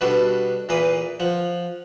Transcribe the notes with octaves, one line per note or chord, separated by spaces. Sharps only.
B2 G3 B3 D4 F#4 A4
E2 A#2 A#3 B4 D#6
F3 F#5